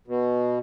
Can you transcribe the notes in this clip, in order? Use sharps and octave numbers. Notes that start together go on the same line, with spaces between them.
B2